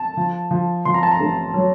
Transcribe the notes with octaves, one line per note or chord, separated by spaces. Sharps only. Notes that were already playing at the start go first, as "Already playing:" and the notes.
Already playing: A5
F3
F3
F3 C6
A#5
A5
A#5
A1
F#3